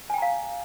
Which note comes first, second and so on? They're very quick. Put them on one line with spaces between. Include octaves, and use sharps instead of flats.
G#5 G5 A#5 F5